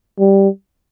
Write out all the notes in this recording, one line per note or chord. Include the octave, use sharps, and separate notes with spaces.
G3